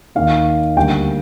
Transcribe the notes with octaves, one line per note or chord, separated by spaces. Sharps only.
D#2 D#3 A#3 F5
D2 D3 G3 A#3 G5